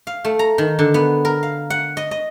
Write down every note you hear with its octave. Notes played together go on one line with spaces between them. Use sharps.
F5
A3
A#5
D#3
D3
B3
A#4
F5
F#5
D#5
D#5